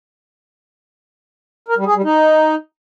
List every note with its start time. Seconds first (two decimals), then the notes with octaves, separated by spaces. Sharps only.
1.69 A#4
1.77 G3
1.86 G#4
1.95 G3
2.04 D#4